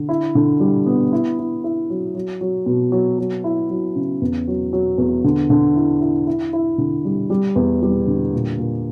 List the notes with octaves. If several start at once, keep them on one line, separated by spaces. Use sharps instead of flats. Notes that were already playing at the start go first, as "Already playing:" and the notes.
Already playing: D3
E4
D3
G3
B3
E4
E4
E4
F#3
F#3
F#3
B2
F#3
F#3
E4
F#3
C#3
E2
F#3
F#3
E2
D3
D3
E4
E4
E4
E4
D3
G3
G3
E2
G3
D3
A#2
A#2